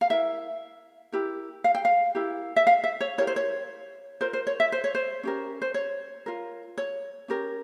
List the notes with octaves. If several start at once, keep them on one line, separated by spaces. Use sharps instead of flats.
F5
E4 A#4 E5
E4 G4 A#4
F5
G5
F5
E4 G4 A#4
E5
F5
E5
C#5
E4 G4 A#4 C#5
C5
C#5
F4 A#4 C5
C5
C#5
E5
C5
C#5
C5
C#4 G4 A#4
C5
C#5
F4 A#4
C#5
C#4 G4 A#4